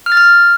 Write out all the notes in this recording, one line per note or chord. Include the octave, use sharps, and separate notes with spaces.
F6
A6
F6